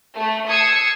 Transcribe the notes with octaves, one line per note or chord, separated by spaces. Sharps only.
A3
D#6 E6 G#6 C7 C#7